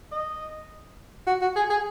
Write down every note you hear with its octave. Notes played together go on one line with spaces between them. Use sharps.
D#5
F#4
F#4
G#4
G#4